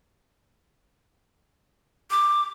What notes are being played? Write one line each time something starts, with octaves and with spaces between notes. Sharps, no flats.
D6